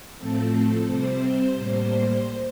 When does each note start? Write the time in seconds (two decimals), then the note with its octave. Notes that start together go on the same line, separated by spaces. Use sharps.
0.18 A2 F3 A3 C4 A4
0.87 C3 G3 C4 C5
1.56 A2 G3 A#3